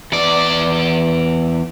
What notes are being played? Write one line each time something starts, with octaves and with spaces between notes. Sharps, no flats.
E2 D5